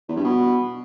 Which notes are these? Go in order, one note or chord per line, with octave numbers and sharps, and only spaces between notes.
E2
G2
B2